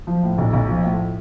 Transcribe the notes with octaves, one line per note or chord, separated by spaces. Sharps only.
F3
A2
B1
B1
F3
A2